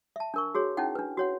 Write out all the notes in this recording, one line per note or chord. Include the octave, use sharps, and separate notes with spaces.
E5 A5
D4 A#4 C#6
F#4 G#4 C#5
C#4 D#4 E4 F#5 G5
D4 B4
F#4 C#5 F#5